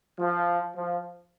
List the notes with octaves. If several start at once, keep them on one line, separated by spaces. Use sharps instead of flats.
F3
F3